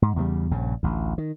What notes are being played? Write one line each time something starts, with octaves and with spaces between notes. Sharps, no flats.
G#2
E2 C#3 E3 G3
A#1 G2 C#3
A1 D2
D#3